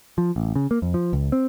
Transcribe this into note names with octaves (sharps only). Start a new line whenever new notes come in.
F3
A1
C#3
A#3
F2
F3
C#2
C4